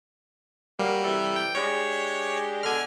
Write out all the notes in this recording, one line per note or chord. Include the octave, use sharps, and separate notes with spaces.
F#3 G3 A#3
C3 E3 A4
G5
G#3 D4 G4 C#5
B2 D3 G#5 F6